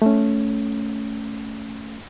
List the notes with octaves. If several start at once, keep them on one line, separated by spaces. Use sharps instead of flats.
A3 C#4